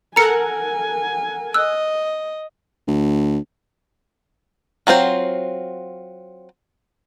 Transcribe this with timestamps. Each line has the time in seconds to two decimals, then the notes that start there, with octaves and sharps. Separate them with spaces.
0.16 A4 A#4 F#5 G#5 A#5 C#7
1.54 D#5 E6 F#6
2.88 D2
4.87 F#3 C4 F4 C5